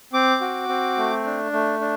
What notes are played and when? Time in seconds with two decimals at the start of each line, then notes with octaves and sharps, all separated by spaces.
0.13 C4 D6
0.41 F#4
0.69 C4
0.97 A3
1.25 D4
1.53 A3
1.81 D4